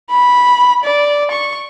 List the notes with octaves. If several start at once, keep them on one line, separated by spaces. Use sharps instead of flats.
B5
D5
C#6